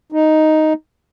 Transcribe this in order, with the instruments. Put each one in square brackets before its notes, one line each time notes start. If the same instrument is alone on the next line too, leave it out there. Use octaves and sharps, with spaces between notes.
[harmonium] D#4